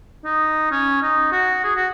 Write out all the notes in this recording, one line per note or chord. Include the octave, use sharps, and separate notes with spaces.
D#4
C#4
D#4
F#4
G#4
F#4